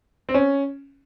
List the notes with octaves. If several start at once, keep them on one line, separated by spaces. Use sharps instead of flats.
C4
C#4